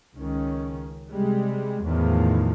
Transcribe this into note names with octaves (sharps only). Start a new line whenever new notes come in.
C#2 D#3 C#4
C3 G3 G#3
E2 A2 D#3 F3